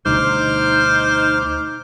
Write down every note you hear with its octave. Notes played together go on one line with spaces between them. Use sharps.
D2 B2 G3 D#4 C5 D6 F6